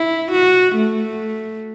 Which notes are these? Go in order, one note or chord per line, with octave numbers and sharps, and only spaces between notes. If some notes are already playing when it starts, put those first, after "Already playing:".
Already playing: E4
F#4
A3